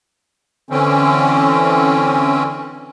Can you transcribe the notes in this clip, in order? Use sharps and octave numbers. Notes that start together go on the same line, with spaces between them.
D3 E3 C4 C#4